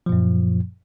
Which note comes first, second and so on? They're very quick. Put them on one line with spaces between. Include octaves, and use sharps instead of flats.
F3 A#2 F#2